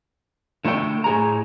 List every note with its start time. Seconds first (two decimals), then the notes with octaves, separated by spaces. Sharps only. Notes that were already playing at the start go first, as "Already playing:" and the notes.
0.65 D3 A3 A4 C#5 G5
1.04 A2 G#4 A#5